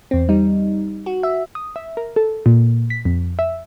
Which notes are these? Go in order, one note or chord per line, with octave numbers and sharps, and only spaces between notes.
E2 C4
G3 D#4
F#4
E5
D#6
E5
A#4
A4
A#2
B6
F2
E5